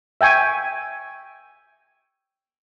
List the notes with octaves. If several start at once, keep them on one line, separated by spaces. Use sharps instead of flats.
E5 G5 G#5 C#6